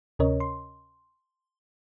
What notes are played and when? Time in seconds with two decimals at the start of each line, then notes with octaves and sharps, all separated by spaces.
0.19 D2 C3 C#4 A#4 C#5 D#5
0.40 C6